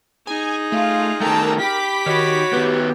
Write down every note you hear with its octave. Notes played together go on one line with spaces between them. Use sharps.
D#4 G#4 G#5
A3 F4 F5
D#3 A3 A#4 G5 A5 A#5
G4 B5 D6 B6
D#3 F#4 C#5
D#3 B3 G4